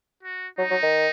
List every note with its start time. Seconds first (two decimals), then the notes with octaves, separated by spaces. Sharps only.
0.23 F#4
0.58 F#3 D#4
0.71 F#3
0.83 D#3